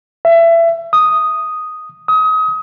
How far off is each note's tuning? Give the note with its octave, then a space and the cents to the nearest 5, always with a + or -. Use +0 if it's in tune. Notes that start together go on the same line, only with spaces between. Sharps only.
E5 +25
D#6 +0
D#6 +30